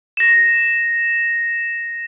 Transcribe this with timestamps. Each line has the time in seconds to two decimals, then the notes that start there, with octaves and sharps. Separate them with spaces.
0.17 A#6 E7